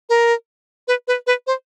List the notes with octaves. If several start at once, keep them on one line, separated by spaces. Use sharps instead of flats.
A#4
B4
B4
B4
C5